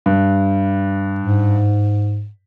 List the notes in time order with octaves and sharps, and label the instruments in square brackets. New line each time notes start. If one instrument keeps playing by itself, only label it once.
[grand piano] G2
[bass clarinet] G#2